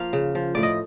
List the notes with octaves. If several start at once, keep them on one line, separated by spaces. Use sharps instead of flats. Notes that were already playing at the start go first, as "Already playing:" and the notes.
Already playing: F3 A#3 F5
C#3
F3
A2 D5
D#5